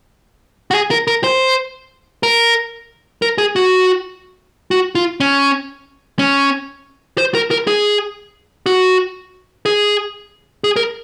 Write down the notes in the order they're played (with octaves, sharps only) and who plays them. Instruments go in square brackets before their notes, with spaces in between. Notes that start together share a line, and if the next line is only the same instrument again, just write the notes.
[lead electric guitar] F#4
G#4
A#4
A#4
C5
A#4
A#4
G#4
F#4
F#4
F4
C#4
C#4
C5
A#4
A#4
G#4
F#4
G#4
G#4
A#4